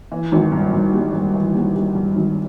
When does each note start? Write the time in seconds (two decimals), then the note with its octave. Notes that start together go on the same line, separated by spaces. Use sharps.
0.12 E3
0.32 G#1
0.52 G2
0.73 G2
0.93 G3
1.13 G2
1.34 E3
1.54 G3
1.75 G3
1.95 G2
2.16 G#1